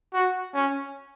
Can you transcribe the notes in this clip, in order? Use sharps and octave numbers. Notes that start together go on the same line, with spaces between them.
F#4
C#4